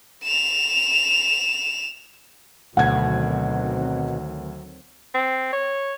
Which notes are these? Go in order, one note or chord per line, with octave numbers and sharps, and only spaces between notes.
E7 F7
D2 B2 D#3 F#3 C4 F#5 G#6
C4
C#5